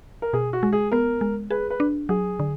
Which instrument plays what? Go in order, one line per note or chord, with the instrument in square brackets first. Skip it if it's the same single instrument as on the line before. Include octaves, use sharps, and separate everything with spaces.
[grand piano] A#4
[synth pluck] B2 [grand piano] G#4
[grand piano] F#4
[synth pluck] G#3
[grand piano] G#4
[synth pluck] B3 [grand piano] A#4
[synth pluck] G#3
[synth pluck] G#4 [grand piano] B4
[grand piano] B4
[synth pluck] D4
[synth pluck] F#3 [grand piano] G#4
[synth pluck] D3